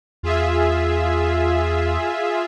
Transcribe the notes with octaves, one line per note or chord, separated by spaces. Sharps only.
E2 F4 G#4 E5